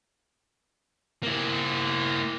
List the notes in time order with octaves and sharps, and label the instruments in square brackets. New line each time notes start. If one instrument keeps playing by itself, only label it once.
[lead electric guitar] A#3 E4